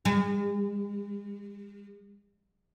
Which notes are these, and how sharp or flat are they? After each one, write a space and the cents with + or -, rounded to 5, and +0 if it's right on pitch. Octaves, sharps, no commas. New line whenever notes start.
G#3 -40